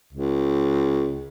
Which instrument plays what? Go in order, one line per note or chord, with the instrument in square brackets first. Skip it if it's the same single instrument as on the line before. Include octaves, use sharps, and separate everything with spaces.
[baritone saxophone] C#2